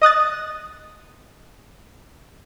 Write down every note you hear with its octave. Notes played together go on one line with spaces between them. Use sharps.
D#5 D#6 F#6 A6